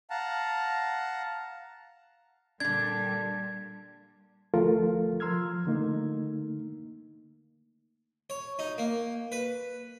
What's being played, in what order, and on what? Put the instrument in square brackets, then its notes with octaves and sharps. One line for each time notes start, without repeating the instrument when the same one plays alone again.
[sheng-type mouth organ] F5 F#5 A5 A#5
[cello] A#2 G3 [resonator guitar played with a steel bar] D3 D4 [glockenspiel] G#6
[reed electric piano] D2 F3 A3 F4 A4 A#4
F3 A#5 C6 E6 F6 G#6
D3 A3 A#3 D#4
[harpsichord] C#5
D#4
A#3
B4